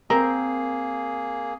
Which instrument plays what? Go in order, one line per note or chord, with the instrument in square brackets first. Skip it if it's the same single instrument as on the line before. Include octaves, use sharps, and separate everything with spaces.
[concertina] A#3 G#4 [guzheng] C4 [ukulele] A#4